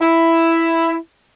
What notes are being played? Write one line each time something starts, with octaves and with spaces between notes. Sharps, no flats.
E4